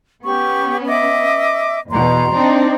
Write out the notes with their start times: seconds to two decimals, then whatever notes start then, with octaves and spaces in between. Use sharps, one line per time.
0.24 B3 C#4 G4 C#6
0.87 D#5 E5 D6
1.90 E2 B2 A#5 C6
2.34 C4 D4 D#4